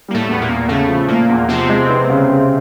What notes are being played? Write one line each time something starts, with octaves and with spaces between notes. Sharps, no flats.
G3 A#3
A2 A3
E2 B3
A#2 A#3
E2
A2 C#3 A3
F3
A#2 A3 A#3
E2
C3 F3 C4
G#3
B3
C#3
C#3